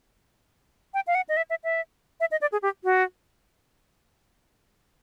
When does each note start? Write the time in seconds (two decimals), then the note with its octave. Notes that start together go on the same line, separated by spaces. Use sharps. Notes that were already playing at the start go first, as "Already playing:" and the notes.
0.94 G5
1.07 F5
1.15 F#5
1.29 D#5
1.37 E5
1.50 E5
1.64 E5
2.20 E5
2.31 D#5
2.41 D5
2.52 G#4
2.62 G4
2.84 F#4